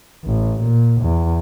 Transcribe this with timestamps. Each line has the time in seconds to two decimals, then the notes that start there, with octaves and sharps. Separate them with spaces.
0.25 A1
0.60 A#2
1.02 E2